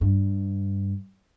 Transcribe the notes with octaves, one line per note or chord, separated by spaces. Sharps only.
G2